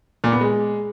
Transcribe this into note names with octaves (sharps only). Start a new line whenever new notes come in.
A#2
B3
G#3